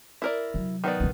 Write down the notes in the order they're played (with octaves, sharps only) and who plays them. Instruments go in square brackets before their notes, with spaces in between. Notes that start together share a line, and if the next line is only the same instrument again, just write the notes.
[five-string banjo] E4 A#4 D5
[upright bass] C3 F#3
[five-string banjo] D#3 B3 D5
[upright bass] D2 C#3